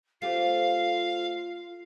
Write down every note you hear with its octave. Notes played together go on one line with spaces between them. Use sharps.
A3 C4 F4 G4 F5